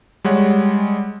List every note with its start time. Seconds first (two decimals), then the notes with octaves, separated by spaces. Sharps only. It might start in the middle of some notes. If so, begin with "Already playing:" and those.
0.24 G3 G#3 C#5 F#5